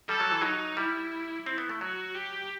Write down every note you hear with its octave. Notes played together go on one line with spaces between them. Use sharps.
G3 A4
F#3
E3
F#3 D#4
G3 E4
C4 E4
B3
A3
F#3 F#4
G4